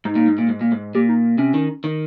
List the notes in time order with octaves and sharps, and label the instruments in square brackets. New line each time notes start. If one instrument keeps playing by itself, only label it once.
[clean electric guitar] G#2 [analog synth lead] D#4
[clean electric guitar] A#2
G#2
A#2
G#2
A#2
G#2
[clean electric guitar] A#2 [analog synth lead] G4
[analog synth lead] D#4
[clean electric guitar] C3 [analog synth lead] C#4
[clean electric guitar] D#3
D#3